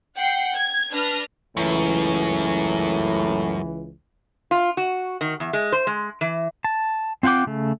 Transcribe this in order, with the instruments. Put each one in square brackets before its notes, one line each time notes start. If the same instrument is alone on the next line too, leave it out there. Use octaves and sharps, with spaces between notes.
[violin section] F#5 G5 C7
G#6
D4 B4 F6 A#6
[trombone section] C#2 E3 [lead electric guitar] F#2 [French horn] A2
[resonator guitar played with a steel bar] F4
F#4
D#3
E2
G#3
C5
G#3
E3
[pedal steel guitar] A5
C4 F4 F#5 G5 D6
C#3 A3